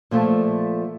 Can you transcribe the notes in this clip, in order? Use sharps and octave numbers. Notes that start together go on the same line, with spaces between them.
A#2 F3 A3